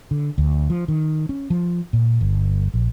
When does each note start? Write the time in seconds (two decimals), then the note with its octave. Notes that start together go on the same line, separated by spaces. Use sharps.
0.11 D3
0.38 D2
0.70 F3
0.88 D#3
1.29 C#4
1.50 F3
1.93 A#2
2.21 G1
2.74 A#1